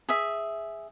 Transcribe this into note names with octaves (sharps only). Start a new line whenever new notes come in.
G#4 E5